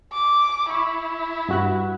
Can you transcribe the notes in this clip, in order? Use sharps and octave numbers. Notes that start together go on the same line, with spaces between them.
D6
E4 C#6
G2 F#4 F#6